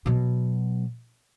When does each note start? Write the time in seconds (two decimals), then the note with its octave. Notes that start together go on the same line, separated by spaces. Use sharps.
0.06 B2 F#3